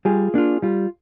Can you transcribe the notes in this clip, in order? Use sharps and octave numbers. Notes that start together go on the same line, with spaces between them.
G3 F4 G#4
A#3 D4 F4
G3 F4